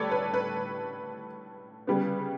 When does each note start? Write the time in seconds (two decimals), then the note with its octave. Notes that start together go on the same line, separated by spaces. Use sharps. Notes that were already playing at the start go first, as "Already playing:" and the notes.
Already playing: A2 G3 A4 B4 C#5 D5
0.11 B4
0.34 B4
1.87 C#3 G3 B3